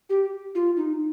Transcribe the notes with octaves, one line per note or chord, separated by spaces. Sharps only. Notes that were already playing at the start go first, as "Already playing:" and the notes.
G4
F4
D#4